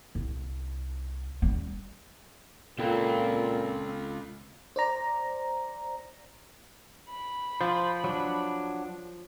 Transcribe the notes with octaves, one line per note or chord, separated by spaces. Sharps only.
C2
G3 C#4
C#2 A#2 C4 F4 A4 G5 B5
C5 D5 A#5
B5
F3 C5
F#3 D4